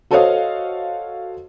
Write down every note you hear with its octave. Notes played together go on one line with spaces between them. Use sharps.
F#4 A4 C5 C#5 D#5 F5